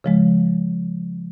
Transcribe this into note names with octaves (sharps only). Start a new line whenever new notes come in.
C#3 F3 G#3